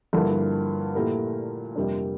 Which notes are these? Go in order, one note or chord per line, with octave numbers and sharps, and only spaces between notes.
G2 D3 F3 A#3 E4
A#2 A3 E4 G4 A#4
F2 C3 G3 A#3 D4